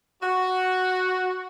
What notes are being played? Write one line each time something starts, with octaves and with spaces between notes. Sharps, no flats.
F#4